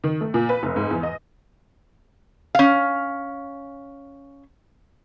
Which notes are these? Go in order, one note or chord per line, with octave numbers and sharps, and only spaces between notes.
D#3
A3
A#2
B4
F1
G#2
E2
D#5
C#4 F5